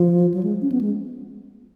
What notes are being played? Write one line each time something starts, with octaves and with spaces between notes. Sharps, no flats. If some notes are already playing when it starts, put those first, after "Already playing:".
Already playing: F3
F#3
G#3
C#4
B3
G#3